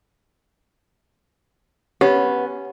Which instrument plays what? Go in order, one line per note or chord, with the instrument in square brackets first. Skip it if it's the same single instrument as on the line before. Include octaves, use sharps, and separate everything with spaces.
[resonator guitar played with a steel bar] B3 [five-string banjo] C#4 [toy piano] G4